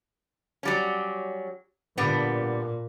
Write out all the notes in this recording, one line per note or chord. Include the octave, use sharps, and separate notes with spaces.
F#3 G3 C#4
A#2 D3 G3 B3